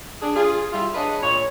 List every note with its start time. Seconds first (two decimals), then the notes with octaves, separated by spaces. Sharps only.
0.21 D4 G#4
0.35 F4 G#4
0.72 G3 E4 F4
0.95 D4 G#4 B4 C#5 D#5
1.22 A#2 C#5